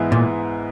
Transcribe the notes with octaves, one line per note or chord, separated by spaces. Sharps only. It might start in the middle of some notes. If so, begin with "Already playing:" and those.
Already playing: G#2 E3 G#3 B3 E4
A#2